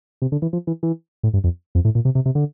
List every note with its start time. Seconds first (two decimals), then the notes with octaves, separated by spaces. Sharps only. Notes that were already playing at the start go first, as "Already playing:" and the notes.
0.22 C3
0.32 D3
0.42 E3
0.53 F3
0.67 E3
0.83 E3
1.23 A2
1.34 G2
1.44 F2
1.75 F2
1.85 A2
1.95 A#2
2.05 C3
2.15 C3
2.26 C3
2.35 D3